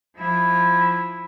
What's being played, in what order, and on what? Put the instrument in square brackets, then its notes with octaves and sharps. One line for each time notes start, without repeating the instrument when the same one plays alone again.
[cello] F3 E4